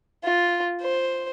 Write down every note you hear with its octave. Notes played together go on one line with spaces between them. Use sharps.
F4
C5